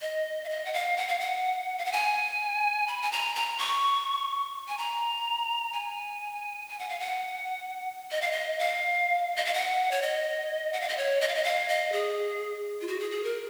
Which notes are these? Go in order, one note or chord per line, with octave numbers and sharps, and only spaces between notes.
D#5
F5
D#5
F#5
F5
F#5
F5
F#5
F5
F#5
G#5
B5
G#5
A#5
A#5
C#6
G#5
A#5
G#5
G#5
F#5
F5
F#5
D#5
F5
D#5
F5
D#5
F5
F#5
C#5
D#5
F#5
F5
D#5
C#5
D#5
F5
D#5
F5
D#5
G#4
F4
F#4
G#4
G#4
A#4